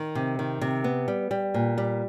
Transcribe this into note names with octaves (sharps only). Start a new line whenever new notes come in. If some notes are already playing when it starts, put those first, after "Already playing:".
Already playing: D#3
C3
D#3
C3
B3
G3
G3
A#2
G3